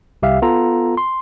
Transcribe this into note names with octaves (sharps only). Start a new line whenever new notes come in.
C2 G4 E5 F5
B3 F4 A4 A#5
C6